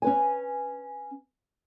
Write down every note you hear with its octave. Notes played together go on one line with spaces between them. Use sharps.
C#4 B4 G#5